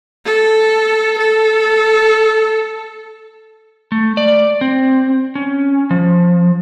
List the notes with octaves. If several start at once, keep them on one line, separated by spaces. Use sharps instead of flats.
A4
A4
A3
D5
C4
C#4
F3